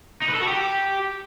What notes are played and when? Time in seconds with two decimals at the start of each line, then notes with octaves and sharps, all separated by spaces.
0.22 D#4
0.28 B4
0.35 A4
0.41 F#4
0.47 G4